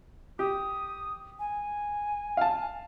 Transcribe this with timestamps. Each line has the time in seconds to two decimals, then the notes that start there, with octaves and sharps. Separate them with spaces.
0.39 G4 D#6
1.39 G#5
2.37 F5 A5